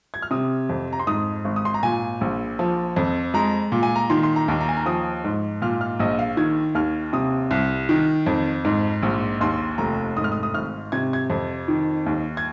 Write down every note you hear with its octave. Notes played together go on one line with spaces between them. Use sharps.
G#6
F6
C3 D#6
F2
A#5
C6
G#2 D#6
G#1
D#6
C6
A#5
A#2 G#5
A#1
F3
F2
G#3 A#5
A#2
G#5
A#5
D#3 C6
C6
A#5
D#2
A#5
G#5
A#5
F3 D#6
G#2
A#2 F6
F6
A#1 D#5
F5
D#3 G#6
D#2 F6
C3 D#6
C2
D#3
F2
G#2
A#1
D#2 C6
F1 A#5
G#2 D#6
F6
D#6
D#6
G#1 F6
C3 G#6
G#6
F2
D#3
D#2
G#6